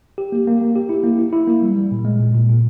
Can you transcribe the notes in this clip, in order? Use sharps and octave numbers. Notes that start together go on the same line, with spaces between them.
G4
A#3
A#3
A#3
G4
E4
A#3
E4
E4
A#3
G3
G3
A#2
G#3
A#2
A#2
A#2